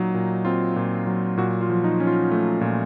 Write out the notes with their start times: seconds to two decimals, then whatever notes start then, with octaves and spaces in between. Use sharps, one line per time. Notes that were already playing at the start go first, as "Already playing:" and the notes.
Already playing: A#2 F#3 D#4
0.14 A#2
0.45 C4 F4
0.76 A#2
1.07 F#3
1.37 A#2 F#4
1.61 F4
1.70 F3
1.84 D#4
2.00 C#4
2.07 F4
2.32 A3
2.61 A#2